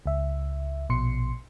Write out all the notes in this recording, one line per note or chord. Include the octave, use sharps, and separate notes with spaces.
C#2 E5
A#1 B2 C6 C7 C#7